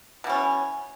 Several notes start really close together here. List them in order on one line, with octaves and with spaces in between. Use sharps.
B2 E3 C#4